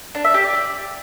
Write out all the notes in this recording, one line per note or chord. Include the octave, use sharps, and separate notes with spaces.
D4
E5
G4
D5